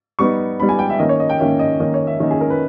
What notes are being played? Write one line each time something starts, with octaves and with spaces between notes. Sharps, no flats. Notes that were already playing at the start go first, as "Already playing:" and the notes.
G3 B3 D#4 C#6
G3 B3 D#4 B5
G#5
G5
E5
D#3 A#3 C#4 D#5
C#5
D#5
G5
D#3 A#3 C#4 E5
D#5
D#3 A#3 C#4 D#5
C#5
E5
D#3 A#3 C#4 D#5
G#4
A#4
B4